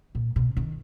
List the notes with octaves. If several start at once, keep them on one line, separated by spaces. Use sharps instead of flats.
A#2
B2
D#3